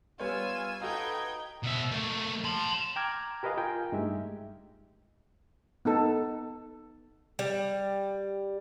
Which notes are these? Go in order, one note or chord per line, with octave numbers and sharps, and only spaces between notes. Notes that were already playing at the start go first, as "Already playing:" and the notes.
G3 B3 F4 C#5 G#5 E6
D#4 F#4 A4 B4 F5 G5 G#6
B2 E5
A3 A#3
A5 C6
G5 A#5 D6 F6 G#6
G4 A#4 B4 D#5 F5 G#5
F4 A#4 G5 G#5
G2 G#3 A3 D#4 G4 E5
B3 D#4 A4
G3